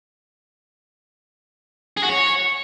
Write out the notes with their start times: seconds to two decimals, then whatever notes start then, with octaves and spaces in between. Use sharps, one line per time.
1.97 G#4
2.03 F#4
2.09 C#5